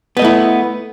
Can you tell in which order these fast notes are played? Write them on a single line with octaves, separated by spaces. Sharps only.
B3 D#5 A3 E4